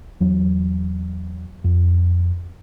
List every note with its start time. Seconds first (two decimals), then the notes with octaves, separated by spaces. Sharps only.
0.21 E2 F#3
1.64 F2